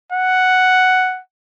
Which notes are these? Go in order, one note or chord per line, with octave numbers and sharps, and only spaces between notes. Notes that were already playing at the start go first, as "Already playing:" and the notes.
F#5